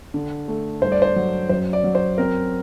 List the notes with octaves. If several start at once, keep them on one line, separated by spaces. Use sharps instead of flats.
D3
A3
G2 C5
D5
C5
F#3
F#2 C5
D5
F#3
C5
C4 A#4